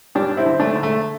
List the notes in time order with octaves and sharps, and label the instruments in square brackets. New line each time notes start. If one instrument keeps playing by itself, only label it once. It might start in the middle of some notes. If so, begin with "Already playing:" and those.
[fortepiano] G2 D4 G4
C4 E4
D3
A3 D4
D3
A3